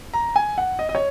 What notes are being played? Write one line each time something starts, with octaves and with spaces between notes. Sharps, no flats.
A#5
G#5
F#5
D#5
D#5
C#5